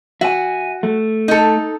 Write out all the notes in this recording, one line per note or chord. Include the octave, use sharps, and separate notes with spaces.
F#4 E5 G#5
A3
D#4 A4